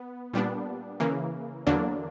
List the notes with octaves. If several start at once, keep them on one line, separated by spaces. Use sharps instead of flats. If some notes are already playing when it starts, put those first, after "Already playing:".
Already playing: B3
A#2 G3 B3 D4
C#3 E3 A#3
E2 D3 F#3 A#3 D4